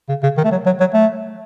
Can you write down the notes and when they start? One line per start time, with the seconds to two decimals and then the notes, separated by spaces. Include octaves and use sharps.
0.09 C#3
0.23 C#3
0.37 D#3
0.44 A3
0.52 F#3
0.66 F#3
0.80 F#3
0.94 A3